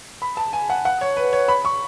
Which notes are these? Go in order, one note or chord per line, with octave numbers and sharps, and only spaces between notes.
B5
A5
G#5
F#5
F#5
C#5
B4
C#5
B5
C#6